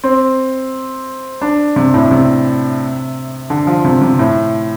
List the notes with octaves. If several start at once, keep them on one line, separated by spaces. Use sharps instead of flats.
C4
D4
C3
A2
C3
D3
F3
C3
C3
A2